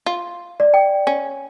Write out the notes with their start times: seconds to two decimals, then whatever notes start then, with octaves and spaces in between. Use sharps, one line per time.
0.06 F4
0.60 D5
0.74 G5
1.07 C#4